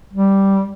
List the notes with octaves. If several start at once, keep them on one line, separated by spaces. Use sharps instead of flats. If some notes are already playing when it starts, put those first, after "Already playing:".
G3